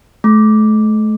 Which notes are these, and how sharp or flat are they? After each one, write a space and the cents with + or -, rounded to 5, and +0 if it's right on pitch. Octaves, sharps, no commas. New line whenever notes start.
A3 -35